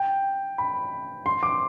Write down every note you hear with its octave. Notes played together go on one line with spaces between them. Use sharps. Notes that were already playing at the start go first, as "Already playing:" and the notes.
Already playing: G5
B5
C6
D6